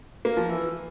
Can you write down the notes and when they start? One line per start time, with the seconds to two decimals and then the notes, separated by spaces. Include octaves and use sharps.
0.25 A#3
0.37 F3
0.49 E3